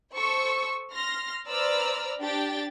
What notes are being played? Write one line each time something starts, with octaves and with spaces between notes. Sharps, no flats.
A4 C5 C#6 E6
C6 F6 A#6
B4 C5 D5 A#5 E6 F6
D4 G4 G5 A6